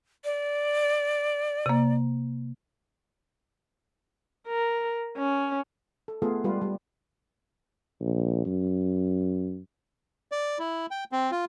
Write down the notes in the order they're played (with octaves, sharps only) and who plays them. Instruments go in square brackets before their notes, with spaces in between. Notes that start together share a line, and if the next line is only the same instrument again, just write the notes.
[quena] D5
[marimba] C3 A#3
[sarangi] A#4
C#4
[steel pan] A4
A3 B3 F4 G#4 A4
G3 G#3 F4 B4
G3
[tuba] A#1
F#2
[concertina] D5
E4
G5
C4
F4